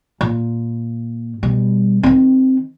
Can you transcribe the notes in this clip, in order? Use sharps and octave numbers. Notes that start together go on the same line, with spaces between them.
A#2
B2 G3
D#3 C4